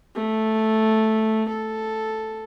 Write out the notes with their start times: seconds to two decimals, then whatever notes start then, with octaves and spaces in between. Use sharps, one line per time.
0.15 A3
1.48 A4